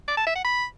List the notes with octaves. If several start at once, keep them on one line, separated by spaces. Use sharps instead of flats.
D5
A5
E5
F#5
B5